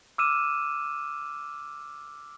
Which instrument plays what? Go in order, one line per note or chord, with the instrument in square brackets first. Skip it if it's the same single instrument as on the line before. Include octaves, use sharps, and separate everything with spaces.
[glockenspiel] D6 E6 F6 D#7 E7